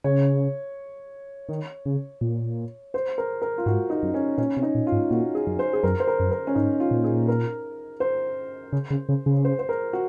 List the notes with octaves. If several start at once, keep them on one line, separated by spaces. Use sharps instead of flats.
C#3 C#5
D#3
C#3
A#2
C5
A#4
A#4
F4
G#2 F#4
D#4
F#2
C#4
A#2 C#4
C3
D#4
A#2
F4
G#2
A#2 F#4
G#4
F#2
C5
G#4
F#2 A#4
C5
A#4
F#2
A#4
C#4
G#2 D#4
F4
A#2
G#4
A#4
C5
C#3
C#3
C#3
C#3
C5
C5
A#4
F#4